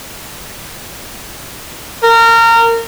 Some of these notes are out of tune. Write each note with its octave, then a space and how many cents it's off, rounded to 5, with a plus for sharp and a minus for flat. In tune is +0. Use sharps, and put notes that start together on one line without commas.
A#4 -25